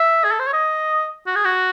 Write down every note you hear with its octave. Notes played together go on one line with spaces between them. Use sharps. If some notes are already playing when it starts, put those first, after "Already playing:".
Already playing: E5
G#4
A4
C5
C#5
D#5
F#4
G#4
F#4